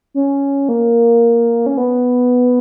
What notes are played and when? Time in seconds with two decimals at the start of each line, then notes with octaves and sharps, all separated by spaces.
0.14 C#4
0.69 A#3
1.66 C#4
1.77 B3